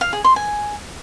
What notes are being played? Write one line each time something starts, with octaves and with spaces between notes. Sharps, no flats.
F5
G#4
C6
G#5